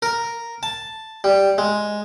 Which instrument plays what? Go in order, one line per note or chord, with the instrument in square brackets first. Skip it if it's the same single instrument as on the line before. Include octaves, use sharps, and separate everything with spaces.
[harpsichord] A#4
A5
G3
G#3